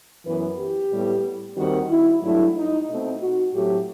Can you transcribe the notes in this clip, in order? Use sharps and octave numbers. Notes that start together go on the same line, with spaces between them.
F#2 E3 B3 B4
G4
A2 G3 B3
D#2 D#3 G3 C4 F#4
E4
G2 F#3 A3 E4
D#4
B2 A3 C4 D#4
F#4
A2 F#3 A3 C4 G4